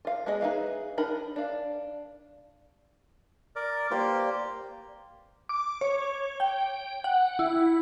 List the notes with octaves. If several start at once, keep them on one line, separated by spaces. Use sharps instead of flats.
F4 F5
G#3 B3 G#4 D#5
D#4 G#4 B4 E5 F5
D4 D#4 A#4 B5
D4 F5
A#4 D5
A#3 G4 C5 D5 F5
D6
C#5
G5
F#5
E4